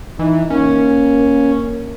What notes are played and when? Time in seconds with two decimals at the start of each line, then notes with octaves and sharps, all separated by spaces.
0.19 E3 D#4
0.50 A#3 C#4